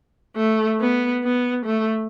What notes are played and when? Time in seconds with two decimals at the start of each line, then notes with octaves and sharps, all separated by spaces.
0.36 A3
0.80 B3
1.23 B3
1.65 A3